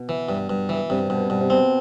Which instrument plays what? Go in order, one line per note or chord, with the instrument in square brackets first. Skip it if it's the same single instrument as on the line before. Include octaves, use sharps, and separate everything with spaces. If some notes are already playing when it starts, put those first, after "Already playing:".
Already playing: [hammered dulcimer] B2
[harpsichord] E3
G2
G2
E3
[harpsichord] G2 [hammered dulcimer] C3
[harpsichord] G2 [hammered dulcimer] B2
[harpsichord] G2 [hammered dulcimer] B2
[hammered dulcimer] C3
[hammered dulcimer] B2 [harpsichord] C4